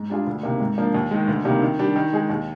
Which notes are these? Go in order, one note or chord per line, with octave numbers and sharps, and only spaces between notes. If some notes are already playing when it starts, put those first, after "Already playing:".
Already playing: G#2
G3 D4 F4 G#4
D2
C3 D#3 A#3
G#2
F3 A#3 D4
D#2
D#3 G#3
D2
C3 D#3 G3 A#3
D#3
G3 D4 G4
D#3
G#3 D#4 G#4
D#2